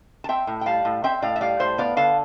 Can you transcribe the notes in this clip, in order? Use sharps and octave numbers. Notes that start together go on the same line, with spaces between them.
A5
C4 E5 G5
A2
G5
G3 F5 A5
A2
C4 E5 G5
A2 D5 F5
E5
G3 D5 F5
A2 C5 E5
B3 D5 F5
D3 F5 A5